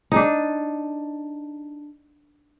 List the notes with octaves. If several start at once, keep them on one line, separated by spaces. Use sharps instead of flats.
D4 D#4